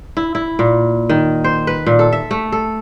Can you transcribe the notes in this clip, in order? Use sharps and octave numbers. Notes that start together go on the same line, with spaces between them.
E4
E4
A#2
D#3
C5
B4
A#2
A4
E5
A3
A4